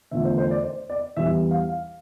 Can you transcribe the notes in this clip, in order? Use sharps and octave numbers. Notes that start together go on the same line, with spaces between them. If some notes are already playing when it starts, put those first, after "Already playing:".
E2 D3 F3 A3 E5
C5
C5
D5
C5
D5
E2 E3 G3 E5
F5
F5